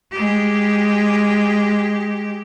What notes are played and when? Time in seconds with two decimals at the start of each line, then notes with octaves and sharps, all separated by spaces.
0.12 G#3 G4